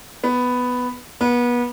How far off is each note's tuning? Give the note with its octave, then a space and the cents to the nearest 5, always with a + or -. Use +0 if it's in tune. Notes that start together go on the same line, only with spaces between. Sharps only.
B3 +5
B3 -30